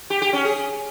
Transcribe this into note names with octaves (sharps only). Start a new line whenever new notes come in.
G4
G4
C#4
G#4